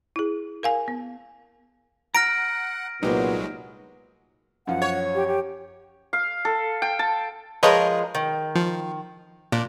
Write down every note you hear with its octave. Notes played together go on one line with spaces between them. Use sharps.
E4 G#4
A#4 F5 G#5
B3
F#5 A#5 F6 A#6 D7
C2 A#2 F#3 G#3 B3 D#4 G4 C5
F#2 F3 F5 F#5
C#5
G4
G4
F5
A4
G5
A5
F3 G#3 A#4 B4 C#5 D#5
D#3
F3
A#2 D4